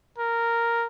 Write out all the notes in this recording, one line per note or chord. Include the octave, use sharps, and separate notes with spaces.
A#4